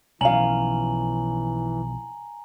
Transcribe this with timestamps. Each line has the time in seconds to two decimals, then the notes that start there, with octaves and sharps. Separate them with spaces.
0.21 B1 E3 F3 C#4 F5 G#5 A#5 F#7